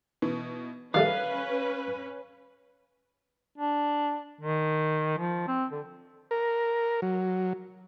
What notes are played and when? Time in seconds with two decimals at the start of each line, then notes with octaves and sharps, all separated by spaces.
0.22 B2 E3
0.94 D#3 G3 A3 C#4 B4 F5 F#6
3.58 D4
4.41 D#3
5.18 F3
5.48 C4
5.72 D3
6.31 A#4
7.02 F#3